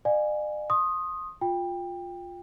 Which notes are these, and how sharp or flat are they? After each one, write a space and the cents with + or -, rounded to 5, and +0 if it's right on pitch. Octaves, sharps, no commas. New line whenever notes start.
D5 +45 F5 +0 G#5 +0
C6 +35 D#6 +0
F4 +15 G5 +20